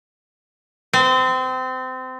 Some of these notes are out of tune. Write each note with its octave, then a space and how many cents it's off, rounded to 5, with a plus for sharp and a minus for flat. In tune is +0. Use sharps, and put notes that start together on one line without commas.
C4 -25